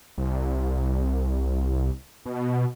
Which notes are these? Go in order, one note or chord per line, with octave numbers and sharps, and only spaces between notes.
C2
B2